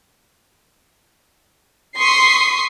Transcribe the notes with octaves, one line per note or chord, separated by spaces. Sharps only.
C6 C#6 D#6 B6 C7